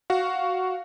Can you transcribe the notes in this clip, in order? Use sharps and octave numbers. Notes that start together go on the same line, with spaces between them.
F#4 F5